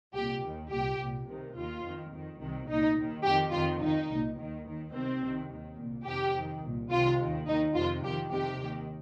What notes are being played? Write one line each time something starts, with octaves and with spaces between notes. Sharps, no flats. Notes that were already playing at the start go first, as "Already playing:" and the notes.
C2 A#2 G4
D#2 D#3
C2 A#2 G4
C2 A#2
C2 C3 D#3
D#2 D#3 F4
F2 D#3
F2 D#3
C2 C3 D#3
C2 A#2 D#4
D#2 D#3
F2 D#3 G4
F2 D#3 F4
F2 D#3 D#4
C2
A#2
D#2 D#3
D#2 D#3
C2 C3 D#3 C4
C2 C3 D#3
D#2 D#3
C2 A#2
F2 C3 D#3 G4
F2 D#3
C2 A#2
C2 C3 D#3 F4
D#2 D#3
D#2 D#3 D#4
F2 C3 D#3 F4
F2 D#3 G4
F2 C3 D#3 G4
D#2 D#3